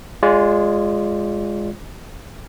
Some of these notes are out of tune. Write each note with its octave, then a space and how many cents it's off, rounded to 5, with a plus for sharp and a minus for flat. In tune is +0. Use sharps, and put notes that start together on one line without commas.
G#3 -10 F4 +0 D5 -40